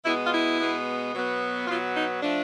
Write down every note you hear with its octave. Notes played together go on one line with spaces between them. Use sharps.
B2 G#3 B3 E4
F4
E4
B2 G#3 B3
B2 F#3 B3
B2 F#3 B3 F4
D#4
F3 A3 D4